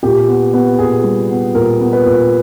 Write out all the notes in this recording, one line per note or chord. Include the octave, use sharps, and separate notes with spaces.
A#2 G4
B3
B3
A#2 G#4
G3
B3
A#2 A#4
B3
B4
A#2